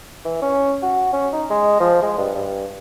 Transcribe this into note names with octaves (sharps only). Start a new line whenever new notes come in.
E3
C#4
F#4
C#4
D#4
G#3
F3
G#3
G2
G2